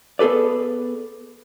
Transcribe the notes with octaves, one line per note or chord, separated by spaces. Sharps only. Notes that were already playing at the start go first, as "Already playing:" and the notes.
B3 G#4 A4 B4 D5